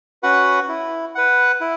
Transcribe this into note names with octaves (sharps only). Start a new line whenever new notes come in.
C#4 F#4 B4 F#5
E4
B4 F#5
E4